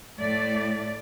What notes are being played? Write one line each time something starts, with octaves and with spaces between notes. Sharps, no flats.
A2 A3 D5